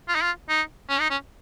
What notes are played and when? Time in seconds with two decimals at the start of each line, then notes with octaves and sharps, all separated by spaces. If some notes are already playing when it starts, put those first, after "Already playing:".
0.08 F4
0.15 D#4
0.23 F4
0.49 D#4
0.89 C#4
1.00 D#4
1.10 C#4